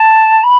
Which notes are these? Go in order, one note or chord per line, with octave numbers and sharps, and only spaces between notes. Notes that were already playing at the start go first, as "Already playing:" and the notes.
Already playing: A5
B5